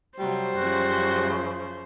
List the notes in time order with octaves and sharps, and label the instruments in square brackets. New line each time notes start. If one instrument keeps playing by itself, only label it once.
[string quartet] C3 F#3 [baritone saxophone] G3 [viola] C5
[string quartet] F#2 C#3 F3 [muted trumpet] F#4